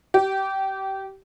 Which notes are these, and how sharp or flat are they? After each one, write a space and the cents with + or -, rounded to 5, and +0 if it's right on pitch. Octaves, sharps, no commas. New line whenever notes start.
G4 -25